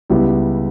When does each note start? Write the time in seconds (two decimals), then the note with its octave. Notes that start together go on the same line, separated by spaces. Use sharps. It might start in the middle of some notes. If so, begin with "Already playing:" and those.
0.10 C#2 C#3 G3 B3 E4